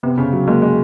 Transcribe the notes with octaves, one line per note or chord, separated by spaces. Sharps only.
C3 B3
C#3
F#3
G#3 A#3
G#3